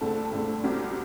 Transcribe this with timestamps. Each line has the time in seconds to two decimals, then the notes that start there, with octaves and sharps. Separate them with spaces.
0.01 G2 D3 A3 C4 A5
0.32 G2 D3 A3 C4
0.64 C2 C3 F#3 C4